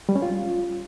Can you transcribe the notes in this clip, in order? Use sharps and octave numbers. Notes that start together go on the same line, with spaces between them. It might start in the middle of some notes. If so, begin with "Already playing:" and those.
G3
C#4
F4